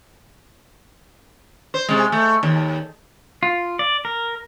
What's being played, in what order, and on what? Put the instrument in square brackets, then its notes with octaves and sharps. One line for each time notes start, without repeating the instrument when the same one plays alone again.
[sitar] C5
C3 G#3
A3
D#2
[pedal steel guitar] F4
D5
A#4